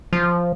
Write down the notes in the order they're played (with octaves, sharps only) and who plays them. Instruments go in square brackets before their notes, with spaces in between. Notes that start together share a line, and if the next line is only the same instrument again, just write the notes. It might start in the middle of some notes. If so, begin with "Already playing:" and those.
[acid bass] F3